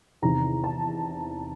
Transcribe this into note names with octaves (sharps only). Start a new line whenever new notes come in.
E2 C3 D#3 A#5
A5